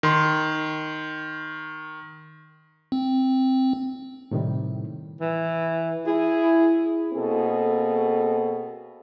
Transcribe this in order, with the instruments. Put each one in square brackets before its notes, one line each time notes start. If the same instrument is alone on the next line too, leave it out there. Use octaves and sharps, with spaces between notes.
[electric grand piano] D#3 C6
[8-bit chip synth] C4
[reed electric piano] A2 C3 D#3 G3
[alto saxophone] E3
[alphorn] E4 [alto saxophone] G#4
[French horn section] B2 A#3 C4 G#4 A4